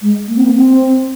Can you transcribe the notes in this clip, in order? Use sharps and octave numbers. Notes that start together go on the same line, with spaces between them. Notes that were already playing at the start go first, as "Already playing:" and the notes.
G#3
A#3
C4
A#3
C4